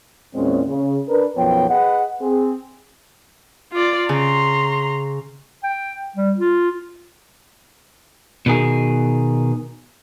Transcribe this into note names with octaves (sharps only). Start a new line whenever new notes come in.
E2 A#2 G#3 C4 C#4
C#3
D4 A#4 B4
B1 F#2 F3 B3 C#5 G5
G#4 B4 D#5 F#5
C4 G#4
F4 D5
C#3 A#5 C6
G5
G3
F4
B2 D#3 G#4